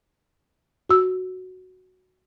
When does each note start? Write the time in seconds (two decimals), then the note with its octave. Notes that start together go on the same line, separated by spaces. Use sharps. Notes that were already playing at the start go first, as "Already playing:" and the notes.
0.89 F#4 E6